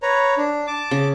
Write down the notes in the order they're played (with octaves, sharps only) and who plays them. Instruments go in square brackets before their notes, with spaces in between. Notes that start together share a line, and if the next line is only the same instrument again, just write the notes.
[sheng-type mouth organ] B4 C#5 A#5
D4
A5 D6
[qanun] C#3